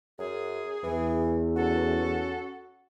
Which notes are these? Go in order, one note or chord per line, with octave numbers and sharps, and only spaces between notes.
F#2 G#4
E2 E3
C#4 F#4 A4